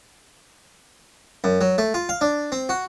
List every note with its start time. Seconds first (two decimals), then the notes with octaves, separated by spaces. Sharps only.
1.44 F#2
1.61 F#3
1.78 A3
1.94 F4
2.09 F5
2.21 D4
2.52 C4
2.69 F#4